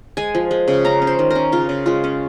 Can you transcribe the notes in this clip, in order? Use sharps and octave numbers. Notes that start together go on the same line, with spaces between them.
G#3 G#5
F3
G#3
C#3
C#4 A#5
C#4
C5
D#3
C#4 A#4
C#3 F4
C#3
G#3 F4
C#4